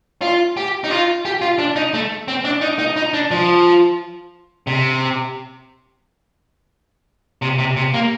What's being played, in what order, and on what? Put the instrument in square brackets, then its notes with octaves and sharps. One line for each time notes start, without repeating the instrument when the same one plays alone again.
[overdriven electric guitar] F4
G4
D#4
F4
G4
F4
D4
D#4
A3
C4
D4
D#4
D#4
D#4
D4
F3
C3
C3
C3
C3
A#3